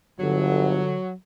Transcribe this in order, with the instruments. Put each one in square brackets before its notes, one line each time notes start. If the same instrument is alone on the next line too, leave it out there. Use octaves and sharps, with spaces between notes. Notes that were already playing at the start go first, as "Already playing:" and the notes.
[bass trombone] G1 [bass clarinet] D3 [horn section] F#3